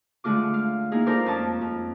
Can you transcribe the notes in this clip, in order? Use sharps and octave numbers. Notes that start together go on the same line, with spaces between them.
D3 G#3 A3 F4 D6
F5
A#3 D#4 E4 G#4
D#4 F4 A4 A#4 C5 D5
F2 C#4 A5
F2